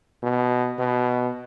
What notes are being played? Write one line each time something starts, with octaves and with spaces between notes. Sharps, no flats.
B2
B2